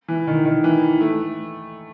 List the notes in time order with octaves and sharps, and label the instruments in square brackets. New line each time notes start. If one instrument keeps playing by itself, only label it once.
[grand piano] E3
D#3
D#3
E3
A3